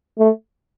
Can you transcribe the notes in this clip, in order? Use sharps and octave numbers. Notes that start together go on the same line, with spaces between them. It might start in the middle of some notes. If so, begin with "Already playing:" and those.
A3